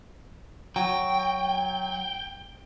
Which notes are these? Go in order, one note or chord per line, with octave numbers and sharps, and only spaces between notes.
F#3 G5